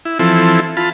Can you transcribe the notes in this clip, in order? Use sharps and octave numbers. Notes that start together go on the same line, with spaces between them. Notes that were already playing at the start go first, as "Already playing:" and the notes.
E4
E3 F3 C4 E4 A4
F4 A5 B5